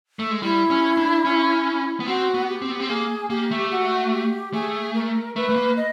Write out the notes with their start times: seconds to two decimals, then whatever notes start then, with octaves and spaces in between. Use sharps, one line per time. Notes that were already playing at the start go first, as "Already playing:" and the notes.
0.19 A3
0.31 G#3
0.43 G3 E4
0.70 C#4
0.97 D4
1.25 C#4
2.00 B3
2.06 C4 F#4
2.34 B3
2.48 G4
2.62 C4
2.71 B3
2.80 C4
2.89 A#3 G#4
3.30 A#3 G4
3.51 A3
3.71 F#4
4.13 G4
4.53 A3 G#4
4.95 A#4
5.36 A3 B4
5.49 A3
5.56 A#3
5.77 D#5